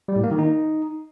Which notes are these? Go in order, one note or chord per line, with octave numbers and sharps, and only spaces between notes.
G3
A2
A#3
D#3
D#4